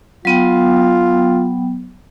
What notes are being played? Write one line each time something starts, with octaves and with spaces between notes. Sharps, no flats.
F#3 B3 F4 G5